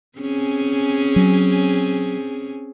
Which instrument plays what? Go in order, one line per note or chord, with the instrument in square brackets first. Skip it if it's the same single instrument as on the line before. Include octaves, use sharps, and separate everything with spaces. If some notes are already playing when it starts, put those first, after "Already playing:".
[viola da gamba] C4 C#4 G#4
[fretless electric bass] F#3